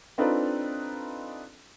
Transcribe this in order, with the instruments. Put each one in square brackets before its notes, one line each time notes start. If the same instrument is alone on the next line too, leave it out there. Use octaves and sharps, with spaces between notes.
[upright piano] C4 D4 D#4 F4 A4 B4